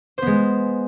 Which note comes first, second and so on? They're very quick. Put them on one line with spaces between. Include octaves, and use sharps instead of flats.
C5 B3 G#3